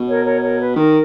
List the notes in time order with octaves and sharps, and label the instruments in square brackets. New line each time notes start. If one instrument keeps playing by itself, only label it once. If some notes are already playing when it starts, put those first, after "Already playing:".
Already playing: [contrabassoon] B2
[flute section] A#4 C#5
A#4 C#5
A#4 C#5
B4
[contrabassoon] D#3 [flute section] A#4